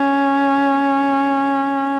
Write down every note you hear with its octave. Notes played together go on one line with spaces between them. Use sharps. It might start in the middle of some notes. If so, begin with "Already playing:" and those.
Already playing: C#4